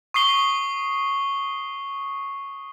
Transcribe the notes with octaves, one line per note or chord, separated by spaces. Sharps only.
C#6 D#6 C7 G7